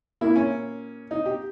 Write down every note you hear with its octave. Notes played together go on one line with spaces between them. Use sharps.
A#2 A#3 E4
C#4
D#4
G4